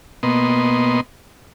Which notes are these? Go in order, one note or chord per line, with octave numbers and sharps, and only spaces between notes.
B2 A#3 B3 D#5 C6